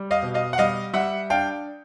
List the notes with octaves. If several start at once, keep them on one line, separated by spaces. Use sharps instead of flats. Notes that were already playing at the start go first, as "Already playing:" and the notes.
Already playing: G3
D#5 F5
B2
D#5 F5
F#5
G3 D#5 F5
G3 E5 F#5
D4 F5 G5